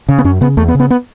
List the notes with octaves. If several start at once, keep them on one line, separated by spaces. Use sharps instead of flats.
C#3
B3
F#2 C#4
C#3 B3
E2 A3
B3
C#3
B3
B3